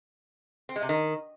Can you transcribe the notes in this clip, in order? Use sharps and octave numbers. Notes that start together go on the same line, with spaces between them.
C4
G#3
C3
D#3